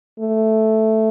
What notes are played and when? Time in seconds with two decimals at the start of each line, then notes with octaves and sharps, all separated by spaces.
0.20 A3